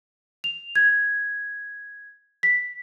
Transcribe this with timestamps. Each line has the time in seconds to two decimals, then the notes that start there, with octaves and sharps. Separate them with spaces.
0.44 F7
0.76 G#6
2.43 B6